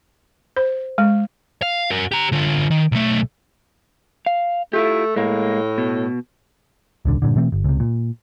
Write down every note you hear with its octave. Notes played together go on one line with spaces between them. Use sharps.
C5
G#3
F5
F#4 A#4
G4 A#5
D3 F4
D#3
B1 A3
F5
A3 E4 F4 G4
A2 G#3 A#3
B2
D#1 C2 D3
G2 A#2 D3
B2 E3 A3 C4
G1
C#2 C3
A#2